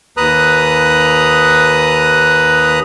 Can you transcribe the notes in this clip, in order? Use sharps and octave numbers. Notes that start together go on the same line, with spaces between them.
D#2 B4 A#5 D#6 F#6